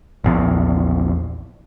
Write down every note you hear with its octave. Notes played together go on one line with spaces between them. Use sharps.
A#1 E2